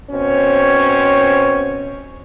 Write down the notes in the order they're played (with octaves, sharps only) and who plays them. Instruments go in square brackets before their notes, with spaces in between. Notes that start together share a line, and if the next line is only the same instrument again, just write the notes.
[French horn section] B2 C4 C#4 C5 C#5